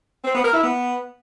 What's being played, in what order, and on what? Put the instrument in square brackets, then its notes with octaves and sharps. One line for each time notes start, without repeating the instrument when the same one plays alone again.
[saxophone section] C4
B3
A#4
E4
B3